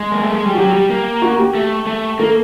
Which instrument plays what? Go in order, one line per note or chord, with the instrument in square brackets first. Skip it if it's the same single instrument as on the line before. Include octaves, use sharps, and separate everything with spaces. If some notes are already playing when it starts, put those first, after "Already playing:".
Already playing: [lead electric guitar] G#3 [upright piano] G#4
[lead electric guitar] A#3
A3
G#3
G3
[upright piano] F#4
[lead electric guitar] F#3 [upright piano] G4
[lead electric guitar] G3
A#3
[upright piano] F#4
G4
[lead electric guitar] A3
A3
[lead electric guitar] A#3 [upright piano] A4